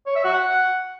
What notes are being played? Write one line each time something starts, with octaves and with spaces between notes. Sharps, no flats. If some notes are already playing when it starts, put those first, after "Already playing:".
C#5
E5
F#4
F#5